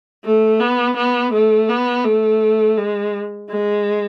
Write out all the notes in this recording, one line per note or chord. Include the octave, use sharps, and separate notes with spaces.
A3
B3
B3
A3
B3
A3
G#3
G#3